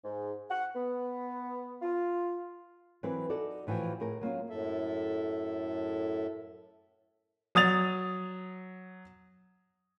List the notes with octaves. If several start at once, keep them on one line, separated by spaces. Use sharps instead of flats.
G#2
F#5
B3
F4
E3 F#3 C4 E4 A#4 B4
D#4 F#4 A4 D5
A2 E3 F3 F#4 G5
A2 G#4 A#4
F#3 A#3 C#4 F4
F#2 A2 A4 E5
F#3 D#6 A6 F7